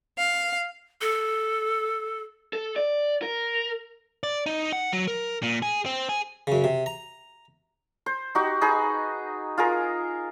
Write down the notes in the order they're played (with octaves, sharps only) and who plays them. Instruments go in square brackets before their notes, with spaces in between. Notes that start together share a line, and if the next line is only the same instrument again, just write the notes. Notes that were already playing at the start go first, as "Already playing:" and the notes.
[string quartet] F5
[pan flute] A4
[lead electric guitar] A4
D5
A#4
[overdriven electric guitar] D5
D#4
F#5
F#3
A#4
A#2
G#4
C4
G#4
[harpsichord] F#2 C#3
C3
A#5
[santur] C5
D#4 F#4 G4
D#4 G#4 B4
F4 G#4 A#4